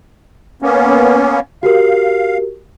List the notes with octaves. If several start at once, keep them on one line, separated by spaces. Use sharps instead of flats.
A#3 B3 C#4
F#4 G4 A#4 F5